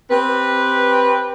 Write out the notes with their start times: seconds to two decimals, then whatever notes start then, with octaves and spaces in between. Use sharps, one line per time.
0.10 C4 G4 B4